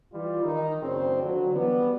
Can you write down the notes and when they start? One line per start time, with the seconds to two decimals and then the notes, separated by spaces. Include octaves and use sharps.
0.13 E3 G3 F4
0.44 D#3 D#4
0.81 F#1 C#3 C4 D4 C5
1.22 D3 F3 F#3
1.54 E3 G3 B3